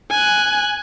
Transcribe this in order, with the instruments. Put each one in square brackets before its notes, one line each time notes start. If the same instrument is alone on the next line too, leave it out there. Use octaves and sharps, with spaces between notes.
[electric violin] G#5 F#6